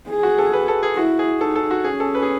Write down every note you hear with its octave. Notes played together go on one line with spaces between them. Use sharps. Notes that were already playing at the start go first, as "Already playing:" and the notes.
G#4
F#4
A4
B4
A4
G#4
E4 F#4
G#4
D#4 A4
A4
F#4
C#4 G#4
A4
B4
G#4